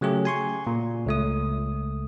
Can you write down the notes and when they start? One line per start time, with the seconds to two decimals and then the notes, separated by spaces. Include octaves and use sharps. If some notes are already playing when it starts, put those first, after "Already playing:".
0.01 C#3 F#3 A3 G4 G#4
0.25 G#5 C6 C#6
0.67 A#2
1.06 C#2 A3 D#6